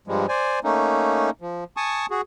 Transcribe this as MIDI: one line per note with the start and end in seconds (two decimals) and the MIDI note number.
0.08 0.26 43
0.08 0.26 53
0.08 0.26 55
0.08 0.26 56
0.29 0.59 72
0.29 0.59 74
0.29 0.59 80
0.64 1.30 57
0.64 1.30 58
0.64 1.30 61
0.64 1.30 63
1.41 1.64 53
1.77 2.06 80
1.77 2.06 81
1.77 2.06 85
1.77 2.06 87
2.11 2.21 66
2.11 2.21 68